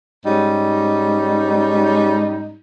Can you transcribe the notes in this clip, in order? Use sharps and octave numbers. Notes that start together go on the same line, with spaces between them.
G#2 G3 C#4 D#4